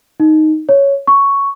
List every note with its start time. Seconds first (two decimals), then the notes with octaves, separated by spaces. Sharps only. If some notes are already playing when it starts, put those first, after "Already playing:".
0.20 D#4
0.69 C#5
1.07 C#6